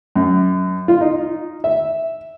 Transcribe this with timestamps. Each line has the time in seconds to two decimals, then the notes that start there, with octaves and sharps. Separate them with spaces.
0.16 F#2
0.88 F4
1.01 D#4
1.64 E5